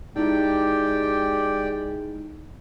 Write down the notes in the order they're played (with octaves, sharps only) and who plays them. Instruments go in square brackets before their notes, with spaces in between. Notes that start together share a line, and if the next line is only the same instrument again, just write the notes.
[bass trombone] G#3 [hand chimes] D#4 E4 [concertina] G4 D5 G5